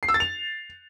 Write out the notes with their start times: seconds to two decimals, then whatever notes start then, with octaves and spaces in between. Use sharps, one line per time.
0.03 C7
0.08 E6
0.14 A6
0.20 F7